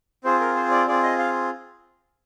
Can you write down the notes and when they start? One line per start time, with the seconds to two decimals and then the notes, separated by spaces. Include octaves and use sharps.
0.24 C4 F4 G#4 C5
0.40 A#4
0.56 C5
0.71 D5
0.87 C4 F4 G#4 D5
1.03 D#5
1.19 F5